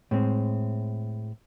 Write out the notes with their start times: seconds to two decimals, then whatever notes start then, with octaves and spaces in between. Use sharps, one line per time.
0.11 A2 G#3 C4